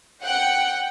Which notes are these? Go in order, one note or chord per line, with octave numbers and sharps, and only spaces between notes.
F#5 G5